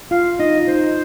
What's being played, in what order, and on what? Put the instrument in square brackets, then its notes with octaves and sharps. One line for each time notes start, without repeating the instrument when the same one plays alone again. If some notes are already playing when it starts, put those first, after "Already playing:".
[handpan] F4 [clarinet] F5
[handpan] D#4 [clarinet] D#5
[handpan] F4
[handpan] D#4 [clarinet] C5